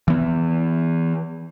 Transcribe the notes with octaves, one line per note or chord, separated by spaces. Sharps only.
E3 B3